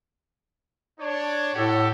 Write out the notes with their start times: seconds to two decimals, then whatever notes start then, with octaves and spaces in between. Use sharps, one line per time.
1.00 D4 C#5
1.55 A2 F#4 G4 A4